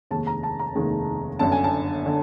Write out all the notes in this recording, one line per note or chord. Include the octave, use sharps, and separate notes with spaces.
F1 D#2 D#3 G#3 A5
A#5
A5
A#5
F1 D#2 D#3 G#3
G1 F#2 D3 A5
G#5
A5
D3